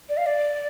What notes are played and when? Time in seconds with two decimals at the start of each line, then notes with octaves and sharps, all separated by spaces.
0.09 D5
0.17 F5
0.26 D5